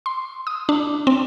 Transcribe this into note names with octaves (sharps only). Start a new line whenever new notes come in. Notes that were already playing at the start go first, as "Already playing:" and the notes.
C6
D#6
D4
C4